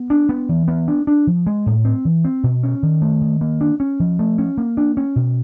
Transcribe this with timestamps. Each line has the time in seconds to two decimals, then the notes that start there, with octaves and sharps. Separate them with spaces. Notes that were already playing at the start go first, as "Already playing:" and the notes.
Already playing: B3
0.10 D4
0.29 B3
0.49 E3
0.68 B3
0.88 D4
1.07 D4
1.27 F3
1.47 G#3
1.66 A2
1.85 C4
2.05 E3
2.25 C4
2.44 B2
2.63 C#4
2.83 D#3
3.02 A3
3.21 D#3
3.41 A#3
3.61 D4
3.80 C#4
4.00 F3
4.19 A3
4.38 C#4
4.58 A#3
4.77 D4
4.97 C#4
5.16 B2